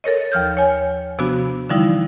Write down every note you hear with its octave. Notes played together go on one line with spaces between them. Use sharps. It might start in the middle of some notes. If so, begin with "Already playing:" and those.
A4 A#4 C#5 D#5
D#2 F3 F6 G6
C#5 G#5
C3 F3 B3 D4 F#4
D3 E3 F3 G3 D#4 E4